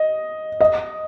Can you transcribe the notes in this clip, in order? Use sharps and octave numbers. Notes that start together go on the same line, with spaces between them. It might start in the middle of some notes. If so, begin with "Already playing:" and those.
Already playing: D#5
D#5